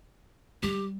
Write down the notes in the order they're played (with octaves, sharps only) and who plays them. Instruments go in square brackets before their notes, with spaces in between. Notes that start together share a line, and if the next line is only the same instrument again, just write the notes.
[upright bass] G3 [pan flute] G4